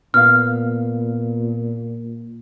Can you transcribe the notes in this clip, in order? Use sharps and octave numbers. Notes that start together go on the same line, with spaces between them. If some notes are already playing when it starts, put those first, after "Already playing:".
A#2 B3 F5 F6